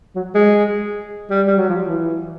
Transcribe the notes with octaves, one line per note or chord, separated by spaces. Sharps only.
F#3
G#3
G3
G3
F#3
F3
E3